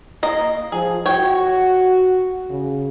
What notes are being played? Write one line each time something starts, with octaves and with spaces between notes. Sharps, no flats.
A#3 D#5
F3 G#4
F#4 C#5 G5
C#3